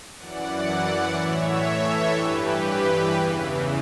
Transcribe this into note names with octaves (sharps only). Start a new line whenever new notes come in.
F#2 E3 D5 F#5
A2 E3 C#5 E5
A4 C#5
G2 E3 G4 B4
E2 C#3 E3